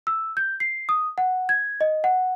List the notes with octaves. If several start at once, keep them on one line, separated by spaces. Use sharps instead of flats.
E6
G6
C7
D#6
F#5
G#6
D#5
F#5